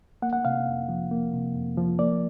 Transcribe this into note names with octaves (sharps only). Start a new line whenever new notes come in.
A#3 F#5
F#5
C3 F5
F2
F3
A#3
C3
F2
F3
A#3 D5